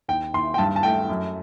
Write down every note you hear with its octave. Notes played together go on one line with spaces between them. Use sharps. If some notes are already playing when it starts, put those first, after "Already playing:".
D#2 G5
D#2 C6
G5
G2 A5
A5
A3 G5
F#2